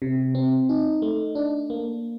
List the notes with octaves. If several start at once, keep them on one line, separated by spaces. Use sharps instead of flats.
C3
C4
D#4
A3
D4
A#3